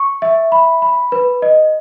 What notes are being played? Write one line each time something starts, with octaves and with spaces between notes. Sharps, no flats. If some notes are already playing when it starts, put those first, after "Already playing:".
Already playing: C#6
E5
B5
B5
B4
D#5